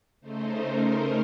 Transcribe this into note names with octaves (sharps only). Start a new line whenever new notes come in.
C#3 A3 D#4 C5
A#4